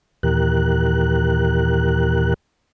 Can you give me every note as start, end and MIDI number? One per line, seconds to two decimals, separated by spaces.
0.23 2.34 39
0.23 2.34 46
0.23 2.34 52
0.23 2.34 67
0.23 2.34 70
0.23 2.34 90